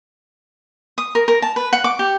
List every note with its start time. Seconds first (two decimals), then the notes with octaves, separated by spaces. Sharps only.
0.98 D#6
1.15 A#4
1.28 A#4
1.42 A5
1.56 B4
1.73 F#5
1.84 D6
1.99 G4